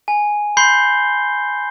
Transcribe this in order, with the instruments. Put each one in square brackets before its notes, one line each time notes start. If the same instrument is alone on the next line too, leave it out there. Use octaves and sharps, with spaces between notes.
[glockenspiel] G#5
B5 C6 G6 C7 G7